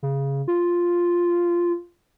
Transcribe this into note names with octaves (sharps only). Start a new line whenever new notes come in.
C#3
F4